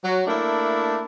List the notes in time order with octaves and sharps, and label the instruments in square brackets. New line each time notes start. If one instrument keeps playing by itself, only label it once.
[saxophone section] F#3
A3 A#3 D4 E4